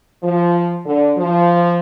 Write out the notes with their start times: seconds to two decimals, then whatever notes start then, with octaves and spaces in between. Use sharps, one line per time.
0.23 F3
0.86 D3
1.17 F3